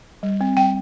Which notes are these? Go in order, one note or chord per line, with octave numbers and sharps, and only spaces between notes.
G3
C4
G3 G5